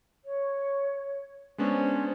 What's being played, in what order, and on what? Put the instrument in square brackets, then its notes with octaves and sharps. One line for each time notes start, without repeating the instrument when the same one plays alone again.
[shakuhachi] C#5
[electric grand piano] G#3 B3 D4 [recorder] C#4 [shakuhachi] C5